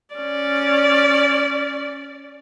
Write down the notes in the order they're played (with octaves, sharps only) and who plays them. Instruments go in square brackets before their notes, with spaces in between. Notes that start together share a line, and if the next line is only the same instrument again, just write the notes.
[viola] C#4 D5